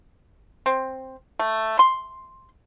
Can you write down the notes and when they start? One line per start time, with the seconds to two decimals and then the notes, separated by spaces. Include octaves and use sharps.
0.66 C4
1.39 A3
1.79 C6